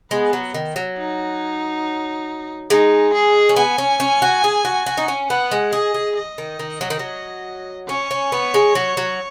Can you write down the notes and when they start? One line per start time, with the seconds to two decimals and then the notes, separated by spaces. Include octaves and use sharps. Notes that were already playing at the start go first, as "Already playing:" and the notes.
0.11 G#3 B3
0.33 F#3
0.54 D#3
0.76 F#3
0.97 D#4
2.70 G#3 D#4
3.13 G#4
3.49 C#4
3.56 B3 G#5
3.78 C#4
4.00 C#4
4.22 F#4
4.44 G#4
4.65 F#4
4.86 F#4
4.97 D#4
5.08 C#4
5.30 B3 F#5
5.51 G#3
5.73 G#4 D#5
5.94 G#4
6.17 D#5
6.38 D#3
6.59 D#3
6.81 F#3
6.90 D#3
6.99 F#3
7.89 C#4 C#5
8.11 C#4
8.32 B3
8.54 G#3
8.75 F#3
8.97 F#3